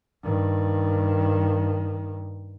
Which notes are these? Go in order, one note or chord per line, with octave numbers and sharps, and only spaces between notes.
G2 D#3